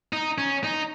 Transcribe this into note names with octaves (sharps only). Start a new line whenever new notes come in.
D#4
C#4
D#4